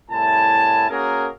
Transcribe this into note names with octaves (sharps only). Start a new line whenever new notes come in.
C2 A2 E4 G#5 A5
A#3 C#4 F#4 G#4 A#4